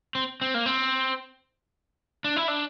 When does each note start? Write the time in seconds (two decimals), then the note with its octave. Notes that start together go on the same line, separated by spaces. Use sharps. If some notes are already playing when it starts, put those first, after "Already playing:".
0.15 C4
0.41 C4
0.54 A#3
0.66 C4
2.24 D4
2.36 E4
2.48 D4